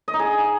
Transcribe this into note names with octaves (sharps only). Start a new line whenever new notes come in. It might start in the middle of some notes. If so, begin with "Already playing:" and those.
D#5
D#4
G#4